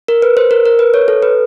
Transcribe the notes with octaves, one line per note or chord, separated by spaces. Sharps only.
A#4
B4
C5
A#4
A#4
B4
C#5
A4
B4